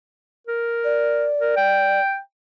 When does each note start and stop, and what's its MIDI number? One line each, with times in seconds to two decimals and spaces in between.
0.47 1.28 70
0.84 2.00 74
1.41 1.54 70
1.57 2.18 79